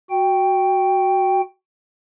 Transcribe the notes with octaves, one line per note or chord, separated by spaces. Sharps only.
F#4 G5